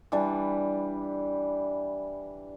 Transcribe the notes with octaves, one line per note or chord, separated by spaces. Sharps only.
E3 G3 D4